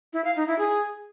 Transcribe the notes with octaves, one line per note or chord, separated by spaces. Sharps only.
E4
F5
D#4
E4
G#4